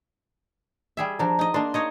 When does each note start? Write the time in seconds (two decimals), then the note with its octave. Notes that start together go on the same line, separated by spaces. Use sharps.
0.97 G3 G#4 E5
1.19 F3 D4 A#5
1.39 D#4 D#5
1.54 A#3 D4 C6
1.74 D#4 C#5 D#5